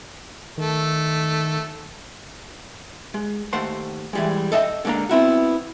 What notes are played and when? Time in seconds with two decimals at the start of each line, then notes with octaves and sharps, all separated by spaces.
0.57 D#3 A3
3.14 G#3
3.53 D#2 A3 C5 F#5 C6
4.13 E3 G3 G#3
4.52 A4 D#5 E5 G5
4.85 D3 G#3 A#3 D4 A#5
5.09 B3 C4 E4 F#4